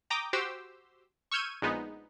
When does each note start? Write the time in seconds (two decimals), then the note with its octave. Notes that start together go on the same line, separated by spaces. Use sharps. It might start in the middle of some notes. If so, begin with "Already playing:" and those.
0.10 G5 A#5 D6 D#6
0.33 F#4 G4 C5 G5 E6
1.31 C#6 E6 F6 G6 G#6 D#7
1.62 A#1 G#3 B3 D#4